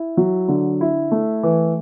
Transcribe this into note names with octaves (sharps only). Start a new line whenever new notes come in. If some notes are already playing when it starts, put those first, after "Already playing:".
Already playing: E4
F#3
D3
E4
A3
E3